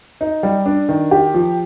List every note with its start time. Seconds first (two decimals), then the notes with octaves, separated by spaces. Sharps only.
0.21 D#4
0.43 G3
0.66 D4
0.89 D#3
1.11 G4
1.34 F3